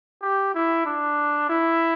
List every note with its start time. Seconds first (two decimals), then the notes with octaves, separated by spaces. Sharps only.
0.22 G4
0.54 E4
0.86 D4
1.49 E4